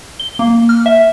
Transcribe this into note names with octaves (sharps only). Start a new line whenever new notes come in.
G7
A#3
F6
E5